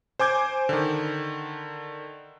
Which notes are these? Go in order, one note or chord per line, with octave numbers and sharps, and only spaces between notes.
C5 G#5 D6 G6 G#6
D3 D#3